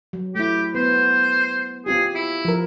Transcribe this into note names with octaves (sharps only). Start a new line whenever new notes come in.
F#3
A3 E4 G4
B3 C5
C4 F4 G4 G#4
E4
F3 A#4